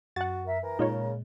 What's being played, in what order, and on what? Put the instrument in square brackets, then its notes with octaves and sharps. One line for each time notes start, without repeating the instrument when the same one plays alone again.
[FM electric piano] F#2 [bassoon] F#4 [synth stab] F#5 A6
[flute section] A#4 E5
[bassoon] E3 [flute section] A#4
[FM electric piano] A#2 G#3 [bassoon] C#3 [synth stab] D#4 F4 C#5